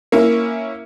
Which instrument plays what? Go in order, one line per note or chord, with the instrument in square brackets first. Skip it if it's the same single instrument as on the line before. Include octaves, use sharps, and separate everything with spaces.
[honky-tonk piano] A#3 C#4 E4 [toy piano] A#4